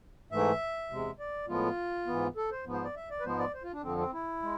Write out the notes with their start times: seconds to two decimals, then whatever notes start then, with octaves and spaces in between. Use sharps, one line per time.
0.31 G#2 E3 A3 E5
0.90 E2 C3 G#3
1.19 D5
1.48 A2 F3 G#3 B3 F4
2.07 G#2 E3 B3
2.36 A4
2.51 C5
2.65 G#2 F3 B3
2.73 C5
2.84 D5
2.96 E5
3.11 D5
3.20 B4
3.25 G#2 F3 G#3 B3 C5
3.39 D5
3.54 C5
3.63 F4
3.73 D4
3.83 F2 D3 F3 C4
3.98 C4
4.13 E4
4.42 G#3